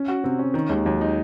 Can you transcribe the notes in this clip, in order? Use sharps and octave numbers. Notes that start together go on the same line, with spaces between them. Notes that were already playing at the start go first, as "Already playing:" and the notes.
Already playing: C#4
F#4
C3 C4
C#4
D#3
D#2 G#3
D#2 F#3
D#4